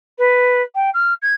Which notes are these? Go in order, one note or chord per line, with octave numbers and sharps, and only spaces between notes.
B4
G5
F6
G#6